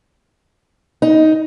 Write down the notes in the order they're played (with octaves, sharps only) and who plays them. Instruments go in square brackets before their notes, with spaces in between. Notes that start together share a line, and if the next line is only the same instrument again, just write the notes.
[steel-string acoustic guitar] D#4